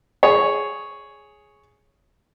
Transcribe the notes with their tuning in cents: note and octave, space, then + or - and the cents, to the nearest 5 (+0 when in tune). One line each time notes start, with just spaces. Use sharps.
G#4 +5 C#5 +0